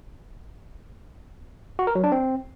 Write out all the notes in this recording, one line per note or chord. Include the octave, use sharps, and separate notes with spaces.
F#4
A#4
F#3
D4
C4